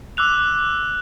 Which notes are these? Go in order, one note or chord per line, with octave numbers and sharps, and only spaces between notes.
D6 E6 F#6 F7